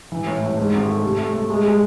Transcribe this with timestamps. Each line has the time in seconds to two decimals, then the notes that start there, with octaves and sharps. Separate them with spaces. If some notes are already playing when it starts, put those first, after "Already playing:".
0.12 E3
0.26 A2
0.43 A2
0.58 G#2
0.73 G#1
0.88 A3
1.03 C3
1.19 A3
1.33 A3
1.50 G#3
1.65 G#3